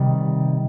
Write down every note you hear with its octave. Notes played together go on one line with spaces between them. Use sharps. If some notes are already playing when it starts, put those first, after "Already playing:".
Already playing: C3 D#3 G3